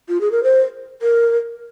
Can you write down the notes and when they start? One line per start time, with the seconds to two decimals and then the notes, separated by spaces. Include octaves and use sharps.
0.09 F4
0.21 G#4
0.32 A#4
0.43 C5
1.02 A#4